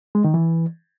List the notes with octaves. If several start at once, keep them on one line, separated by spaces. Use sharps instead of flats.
G#3
D#3
E3